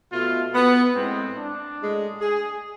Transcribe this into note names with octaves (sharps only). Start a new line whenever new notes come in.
B2 A3 F4
B3
A2 G#3 C4
D4
A2 G#3
G#4